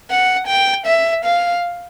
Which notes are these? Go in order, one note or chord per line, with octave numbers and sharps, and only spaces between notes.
F#5
G5
E5
F5